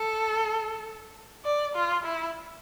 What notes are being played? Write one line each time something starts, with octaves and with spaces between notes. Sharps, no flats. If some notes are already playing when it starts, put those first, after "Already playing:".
Already playing: A4
D5
F4
E4